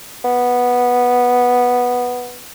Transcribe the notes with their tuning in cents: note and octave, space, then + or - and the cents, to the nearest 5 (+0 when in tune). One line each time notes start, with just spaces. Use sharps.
B3 -5